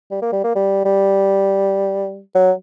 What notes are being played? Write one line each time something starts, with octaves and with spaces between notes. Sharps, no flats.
G3
A#3
G3
A#3
G3
G3
F#3